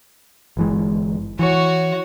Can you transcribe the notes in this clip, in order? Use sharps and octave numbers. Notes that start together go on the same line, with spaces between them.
G1 E3 G#3
E3 F#4 C#5